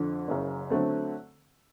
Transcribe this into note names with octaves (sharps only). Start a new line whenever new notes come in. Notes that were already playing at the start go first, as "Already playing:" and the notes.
Already playing: F2 D3
F#1 F#2 C#3
D3 F#3 A3 C4